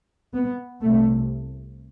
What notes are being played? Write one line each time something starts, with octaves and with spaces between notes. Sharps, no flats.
B3
C2 C3 A3